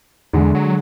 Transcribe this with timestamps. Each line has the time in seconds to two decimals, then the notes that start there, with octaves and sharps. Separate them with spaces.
0.33 E2 D3 G#3
0.55 F#3